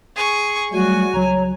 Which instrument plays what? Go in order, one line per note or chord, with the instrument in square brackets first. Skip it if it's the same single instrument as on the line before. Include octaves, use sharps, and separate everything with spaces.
[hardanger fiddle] G#4 C#6
[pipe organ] F#3 G3 A3 [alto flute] F#4 [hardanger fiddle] G#5
[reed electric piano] C#2 F#3 [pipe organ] C#5 A#5